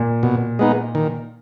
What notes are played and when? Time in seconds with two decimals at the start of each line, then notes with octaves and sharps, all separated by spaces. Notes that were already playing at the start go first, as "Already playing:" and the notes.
Already playing: A#2
0.23 B2
0.59 G#3 B3 D#4
0.95 D#3